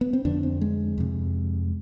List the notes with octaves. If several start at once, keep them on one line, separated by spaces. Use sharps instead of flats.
B3
C4
F2 D3 D4
C4
G#3
F2 C3